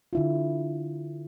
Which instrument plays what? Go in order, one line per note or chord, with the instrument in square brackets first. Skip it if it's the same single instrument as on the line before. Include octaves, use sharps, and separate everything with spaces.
[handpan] D3 E4 F4